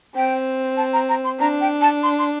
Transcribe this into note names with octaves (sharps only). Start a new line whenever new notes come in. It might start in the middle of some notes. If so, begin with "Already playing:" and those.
C4 G5
A5
A#5
A#5
C6
D4 A#5
G5
A5
C6
C6